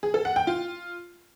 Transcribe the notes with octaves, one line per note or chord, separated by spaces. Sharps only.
G#4
A4
F#5
G5
F4